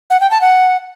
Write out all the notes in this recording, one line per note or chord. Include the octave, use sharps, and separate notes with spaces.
F#5
G5
A5
F#5